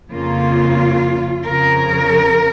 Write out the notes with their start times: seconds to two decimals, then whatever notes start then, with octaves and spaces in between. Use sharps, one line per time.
0.11 F2 C#3 A#3 F4
1.45 F2 C#3 F3 A#4